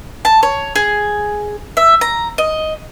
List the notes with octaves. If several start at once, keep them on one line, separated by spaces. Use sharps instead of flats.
A5
C#5
G#4
E5
A#5
D#5